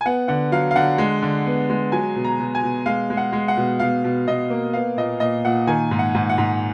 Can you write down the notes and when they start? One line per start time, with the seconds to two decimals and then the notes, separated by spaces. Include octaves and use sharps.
0.01 G#5
0.06 B3 F#5
0.28 D3 F#5
0.52 F#3 F5
0.71 F5
0.76 D3 F#5
0.98 G#3
1.22 D3
1.46 B3
1.70 G#3
1.92 F#3 G#5
2.15 B2
2.24 A#5
2.39 B2
2.55 G#5
2.63 B2
2.86 G#3 F5
3.10 G#3
3.17 F#5
3.33 G#3
3.48 F#5
3.57 B2
3.79 B2 F5
4.04 B2
4.27 B2 D#5
4.50 A#3
4.73 B3 F5
4.97 A#2 D#5
5.20 A#2 D#5
5.45 A#2 F#5
5.67 D#3 G#5
5.91 G#2
5.99 F#5
6.15 G#2
6.29 F#5
6.38 G#2